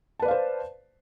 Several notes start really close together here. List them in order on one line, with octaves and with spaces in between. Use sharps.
A5 B4 D5 F5 C5